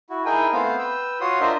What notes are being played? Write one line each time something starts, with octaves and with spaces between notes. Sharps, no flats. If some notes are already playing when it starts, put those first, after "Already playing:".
E4 F#4
D#4 E4 G#4 A#4 G5 G#5
A3 B3 C4 C5 F5
B4 G5 E6
F4 F#4 C#5 C6 D#6
D4 F4 A#4 C5 D#5 E5